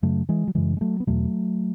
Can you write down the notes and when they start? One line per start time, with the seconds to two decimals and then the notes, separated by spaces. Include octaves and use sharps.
0.02 F#2 C#3 F#3 A3
0.29 E3 G#3
0.48 F#3
0.55 F#2 C#3 E3 G#3
0.77 G#3
0.81 F#3 A3
1.00 B3
1.07 E2 B2 F#3 A3